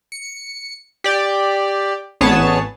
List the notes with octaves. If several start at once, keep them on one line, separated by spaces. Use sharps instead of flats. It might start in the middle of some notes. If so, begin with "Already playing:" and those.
C#7
G4 D5
A1 B3 G#4 C#5 A5